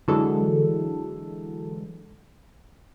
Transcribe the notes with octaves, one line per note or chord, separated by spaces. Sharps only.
D3 E3 F#3 G#3 A4